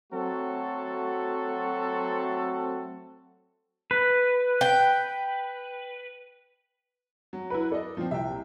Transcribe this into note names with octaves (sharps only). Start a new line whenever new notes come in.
F#3 A3 C4 F#4 A4
B4
G5
F#3
E4 B4
A4 D5 D#5
A#2 F3 C4
C2 E5 G5